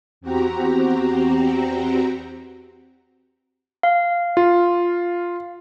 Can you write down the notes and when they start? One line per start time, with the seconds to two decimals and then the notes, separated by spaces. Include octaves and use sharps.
0.21 E2 C4 F#4 G4 A#5
3.83 F5
4.37 F4